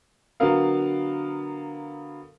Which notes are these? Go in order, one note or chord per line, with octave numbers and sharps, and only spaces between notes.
D3 F#3 B3 A#4 F5